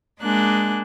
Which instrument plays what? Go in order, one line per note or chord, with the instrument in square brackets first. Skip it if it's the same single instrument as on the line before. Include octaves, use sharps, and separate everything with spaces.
[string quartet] G#3 A#3 D4 G#4 F#6